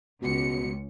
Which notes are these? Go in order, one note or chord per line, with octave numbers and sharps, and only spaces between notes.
C#2 B2 C#7